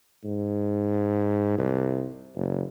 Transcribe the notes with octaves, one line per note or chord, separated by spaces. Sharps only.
G#2
C2
F#1